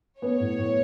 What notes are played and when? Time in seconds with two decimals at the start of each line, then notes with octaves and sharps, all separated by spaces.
0.22 B3 C#5
0.40 A2
0.58 A2